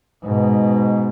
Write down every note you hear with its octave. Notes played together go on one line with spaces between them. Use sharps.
G#2 B2